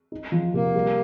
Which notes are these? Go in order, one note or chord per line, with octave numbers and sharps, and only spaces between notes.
D#4
F3
C3 A#3
G3